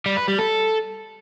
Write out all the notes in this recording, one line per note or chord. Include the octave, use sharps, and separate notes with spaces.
G3
B4
G3
A4